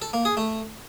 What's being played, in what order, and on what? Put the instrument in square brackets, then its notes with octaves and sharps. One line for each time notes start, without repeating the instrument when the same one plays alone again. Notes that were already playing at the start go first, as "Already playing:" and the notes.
[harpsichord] A4
A#3
G#4
A3